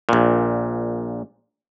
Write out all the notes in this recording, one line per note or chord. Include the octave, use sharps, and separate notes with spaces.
A#1 A#2